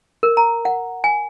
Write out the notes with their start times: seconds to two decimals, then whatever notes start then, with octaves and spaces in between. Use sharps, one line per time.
0.23 A#4
0.37 A#5
0.65 F#5
1.04 G#5